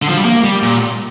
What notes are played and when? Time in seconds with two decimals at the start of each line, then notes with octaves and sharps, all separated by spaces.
0.02 D3
0.09 F3
0.17 G3
0.25 A#3
0.44 G3
0.63 A#2